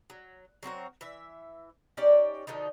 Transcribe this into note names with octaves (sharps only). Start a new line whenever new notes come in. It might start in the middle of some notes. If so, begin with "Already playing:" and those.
F#3
F#3 C4 F#4 A#4
E3 E5
C#4 D#4 G4 D5
B2 D3 F3 D#4